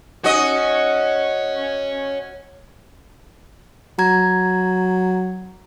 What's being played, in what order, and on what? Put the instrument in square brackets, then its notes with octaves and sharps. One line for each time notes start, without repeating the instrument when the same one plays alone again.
[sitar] F#4 D#5 [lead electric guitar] C#5 G#5
[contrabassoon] F#3 [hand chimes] A#5 G#6